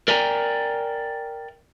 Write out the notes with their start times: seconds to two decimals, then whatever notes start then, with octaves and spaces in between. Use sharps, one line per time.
0.08 A#4 D5 E5 G5 G#5 A#5